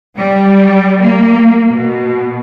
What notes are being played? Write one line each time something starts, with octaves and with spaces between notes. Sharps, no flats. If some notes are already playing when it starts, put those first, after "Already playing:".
G3
A#3
B2